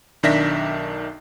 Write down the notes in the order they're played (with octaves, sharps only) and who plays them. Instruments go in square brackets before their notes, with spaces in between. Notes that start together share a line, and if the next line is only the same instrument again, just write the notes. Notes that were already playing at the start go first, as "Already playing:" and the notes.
[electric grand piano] B1 D#3 D4 E5 A#6 B6